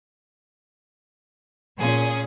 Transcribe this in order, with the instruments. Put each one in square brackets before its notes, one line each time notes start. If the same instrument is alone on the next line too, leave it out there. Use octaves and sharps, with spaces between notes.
[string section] A#2 [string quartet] C#4 G#4